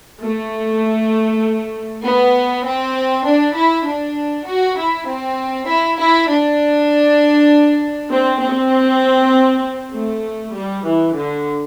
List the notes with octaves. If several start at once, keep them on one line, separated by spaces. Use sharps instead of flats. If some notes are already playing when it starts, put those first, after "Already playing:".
A3
B3
C4
D4
E4
D4
F#4
E4
C4
E4
E4
D4
C4
C4
A3
G3
E3
D3